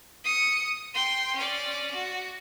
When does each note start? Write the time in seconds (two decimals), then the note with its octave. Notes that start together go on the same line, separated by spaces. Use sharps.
0.24 D#6 C#7
0.94 G5 C6
1.35 C#4 D5
1.94 F#4